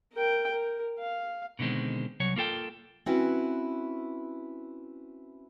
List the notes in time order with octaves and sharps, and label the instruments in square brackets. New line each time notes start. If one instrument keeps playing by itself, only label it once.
[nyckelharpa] A#4 G5
A#4
F5
[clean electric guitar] B2 D3 D#3 G#3 C4
C2 F#3 C#5
A#3 F4 A4 G5
[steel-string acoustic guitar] C4 C#4 E4 F#4 B4